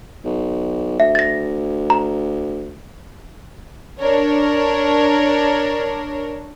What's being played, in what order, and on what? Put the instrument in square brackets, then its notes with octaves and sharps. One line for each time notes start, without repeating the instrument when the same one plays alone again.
[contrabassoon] B1
[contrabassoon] D2 [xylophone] E5
[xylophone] A6 A#6
A#5
[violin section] D4 A#4 C#5